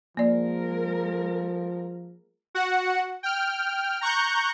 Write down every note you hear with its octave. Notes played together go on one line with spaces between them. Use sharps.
F3 G#3 A#3 A#4 D5
F#4 F#5
G5 F6
A#5 C#6 F#6 G6